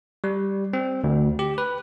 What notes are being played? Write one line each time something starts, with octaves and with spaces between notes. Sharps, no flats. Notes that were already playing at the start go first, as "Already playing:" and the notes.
G3
C4
D2
G4
B4